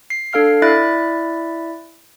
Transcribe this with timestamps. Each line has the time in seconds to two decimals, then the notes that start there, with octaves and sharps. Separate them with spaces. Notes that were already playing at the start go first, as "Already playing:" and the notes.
0.10 C7
0.33 D4 A4 F5 F6 C7
0.62 E4 D5 E5 B5 F#6 A6